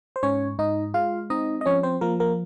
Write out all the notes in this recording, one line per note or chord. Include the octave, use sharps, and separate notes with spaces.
C5
G#2 C#4 C#5
G#2 D#4 D#5
G#3 F4 F5
C4 D#4 D#5
D#5
F3 C#4 C#5
C4 C5
F3 A#3 A#4
A#3 A#4